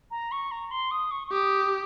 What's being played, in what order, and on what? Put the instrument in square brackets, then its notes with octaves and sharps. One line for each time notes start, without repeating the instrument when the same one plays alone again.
[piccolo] A#5
C#6
A#5
C6
D#6
C#6
C#6
[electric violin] G4 [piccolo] D#6